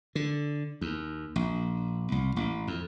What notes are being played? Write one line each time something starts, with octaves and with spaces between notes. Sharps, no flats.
D3
D#2
A#1
C2
A1
F2